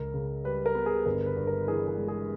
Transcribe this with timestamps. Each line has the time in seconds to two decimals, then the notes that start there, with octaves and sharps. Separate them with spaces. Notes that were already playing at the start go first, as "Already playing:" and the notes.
Already playing: C#2 A#4
0.14 C#3
0.44 G3 B4
0.66 A#4
0.75 B3
0.86 G#4
1.06 G1 A#4
1.26 B4
1.36 G2
1.47 A#4
1.67 E3 G#4
1.88 G#4
1.98 G#3
2.08 G#4